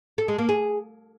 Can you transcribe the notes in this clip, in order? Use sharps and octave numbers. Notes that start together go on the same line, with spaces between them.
A4
G#3
A#3
G#4